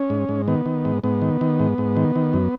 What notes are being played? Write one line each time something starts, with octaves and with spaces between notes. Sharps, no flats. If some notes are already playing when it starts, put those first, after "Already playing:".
Already playing: C#4
G#2
G#2
D#3 B3
D#3
G#2
G#2 B3
D#3
D#3
G#2
G#2
D#3
D#3
F#2